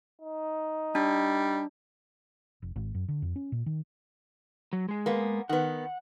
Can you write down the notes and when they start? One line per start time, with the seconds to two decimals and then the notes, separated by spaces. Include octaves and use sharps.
0.22 D#4
0.95 G3 D4
2.62 F1
2.76 G#1
2.94 F#2
3.08 D3
3.22 F2
3.36 C#4
3.52 A#2
3.66 D#3
4.73 F#3
4.89 G#3 G#4
5.06 A#3 B3
5.49 D#3 B3 F#5